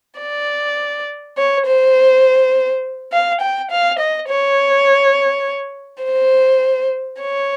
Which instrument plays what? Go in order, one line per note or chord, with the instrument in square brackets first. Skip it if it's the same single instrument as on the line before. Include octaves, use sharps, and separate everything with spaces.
[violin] D5
C#5
C5
F5
G5
F5
D#5
C#5
C5
C#5